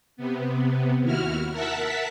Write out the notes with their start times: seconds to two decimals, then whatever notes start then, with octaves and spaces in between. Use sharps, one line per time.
0.17 C3 B3
1.02 D#2 E4 F#4 F6
1.51 A#4 E5 F#5 A5 B6